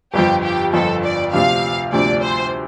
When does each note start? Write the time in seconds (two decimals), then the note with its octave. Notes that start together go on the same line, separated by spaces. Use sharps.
0.13 G1 F2 F3 G4
0.43 G4
0.73 G1 F2 F3 A4
1.03 D5
1.33 D2 C3 F3 D4 F5
1.92 D2 C3 F3 D4 D5
2.22 C5